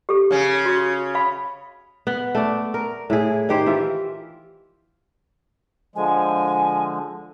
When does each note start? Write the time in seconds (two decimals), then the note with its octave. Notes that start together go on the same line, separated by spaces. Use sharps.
0.09 G4 A4
0.31 C#3 C#4
0.66 F#4
1.15 F5 B5
2.07 B3
2.35 A3 D5
2.74 A#4
3.10 A2 E4 G#4
3.49 D#3 G4 C5
3.66 E3 F4 E5
5.96 D3 F3 G#3 G#5